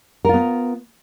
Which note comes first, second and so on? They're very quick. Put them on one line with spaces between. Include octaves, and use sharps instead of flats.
A#4 F4 B3